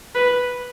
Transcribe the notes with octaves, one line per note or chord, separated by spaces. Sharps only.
B4